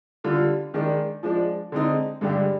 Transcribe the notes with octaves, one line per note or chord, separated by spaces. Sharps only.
D3 G3 D4 F4
D#3 G#3 D4
F3 G#3 D4
D3 G#3 C4 D#4
G2 D3 G#3 D4 G4